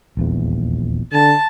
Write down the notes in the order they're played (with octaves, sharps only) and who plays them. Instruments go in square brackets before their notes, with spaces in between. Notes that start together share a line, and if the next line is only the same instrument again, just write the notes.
[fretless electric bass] D#1 A#1 E2
[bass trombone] D3 [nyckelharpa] A5